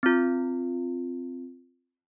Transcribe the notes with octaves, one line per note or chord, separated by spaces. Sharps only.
C4 F4